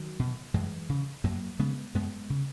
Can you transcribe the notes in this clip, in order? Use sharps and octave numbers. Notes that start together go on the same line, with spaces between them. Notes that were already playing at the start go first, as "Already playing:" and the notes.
Already playing: D#3 F#3
B2
F#2 E3 G#3
C#3
F#2 F#3 A#3
C#3 G#3 B3
F#2 G#3 B3
C#3